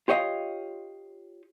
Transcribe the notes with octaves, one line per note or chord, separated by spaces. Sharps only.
F4 G4 C#5 D#5 F5